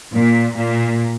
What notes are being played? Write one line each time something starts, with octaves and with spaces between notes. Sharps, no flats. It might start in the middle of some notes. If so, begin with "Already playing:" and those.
A#2
A#2